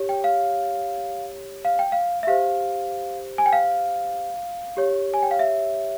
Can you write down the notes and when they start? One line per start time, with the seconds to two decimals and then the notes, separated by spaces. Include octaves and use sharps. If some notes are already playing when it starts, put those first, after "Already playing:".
Already playing: G4 C#5
0.09 G5
0.24 F5
1.65 F5
1.79 G5
1.92 F5
2.23 E5
2.27 G4 C5 F5
3.38 G#5
3.46 G5
3.53 F5
4.77 G4 C#5
5.14 G#5
5.23 G5
5.31 F5
5.39 E5